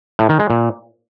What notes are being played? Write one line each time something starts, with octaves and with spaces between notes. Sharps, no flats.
A2
D#3
G#3
A#2